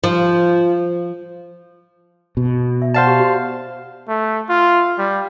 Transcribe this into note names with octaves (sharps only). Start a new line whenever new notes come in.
F3
B2
E5
C5 D5 F5 F#5 A5
G4
F#4
A3
F4
G3